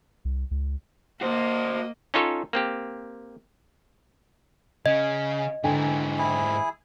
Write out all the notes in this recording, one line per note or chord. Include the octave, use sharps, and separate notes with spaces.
C2
C#2
A#3 F#4 C5 D#5
C#4 D#4 F4 A4 C#5
A#3 C4 G4
C#3 D#5
G#2 D3 E3 G5 G#5
E4 G#4